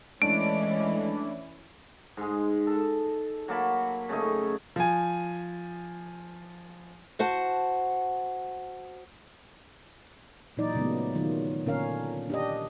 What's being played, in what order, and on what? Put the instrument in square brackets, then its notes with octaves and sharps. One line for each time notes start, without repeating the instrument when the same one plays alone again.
[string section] E3 C#4 E4 [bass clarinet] G#3 [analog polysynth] A3 D4 D5 [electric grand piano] D7
[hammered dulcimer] G#2 G#3
A4
F#3 A#3 A5 B5
C#3 A3 D#4
[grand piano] F3 G#5
[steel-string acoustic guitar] F#4 C5 F#5 A5
[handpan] A#2 E3 F#3 D#4 D5
A#2 C#3 F#3 G#3 A3 B3
D#3 F#3 F4
A#2 D3 C#4 A#4 F5
D4 G4 D#5